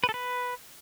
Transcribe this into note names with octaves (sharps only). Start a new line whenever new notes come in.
B4
A4
B4